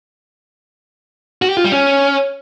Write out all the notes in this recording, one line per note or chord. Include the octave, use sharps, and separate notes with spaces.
F#4
G4
F4
G3
C#4